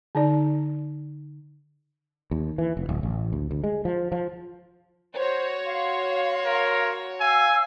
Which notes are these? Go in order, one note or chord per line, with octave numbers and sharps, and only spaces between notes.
D3 D#4 D5
D#2
E3
F1
D1
A1
D2
D2
G#3
F3
F3
F#4 C5 C#5
F5 C6
A#4
F5 G#5 E6